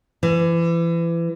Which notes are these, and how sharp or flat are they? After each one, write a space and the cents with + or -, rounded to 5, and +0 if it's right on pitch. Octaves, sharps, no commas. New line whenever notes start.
E3 +30